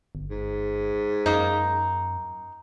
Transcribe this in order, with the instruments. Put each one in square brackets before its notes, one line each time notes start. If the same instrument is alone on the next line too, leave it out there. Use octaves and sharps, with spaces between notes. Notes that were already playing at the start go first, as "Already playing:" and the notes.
[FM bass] G1
[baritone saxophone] G#2
[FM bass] F#2 [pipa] A#3 D#4